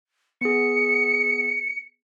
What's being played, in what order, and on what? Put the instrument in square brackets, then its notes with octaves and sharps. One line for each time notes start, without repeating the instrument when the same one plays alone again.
[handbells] B3 G#4 [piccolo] C#7